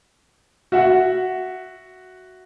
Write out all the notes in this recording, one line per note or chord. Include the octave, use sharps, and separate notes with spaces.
F#4 E5 F#5